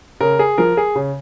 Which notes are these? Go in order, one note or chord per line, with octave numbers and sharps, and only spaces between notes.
C#3 A#4
G#4
F3 A#4
G#4
C#3